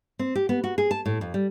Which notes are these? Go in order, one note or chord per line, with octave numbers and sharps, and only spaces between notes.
C4
G4
B3
F#4
G#4
A5
A2
F2
G3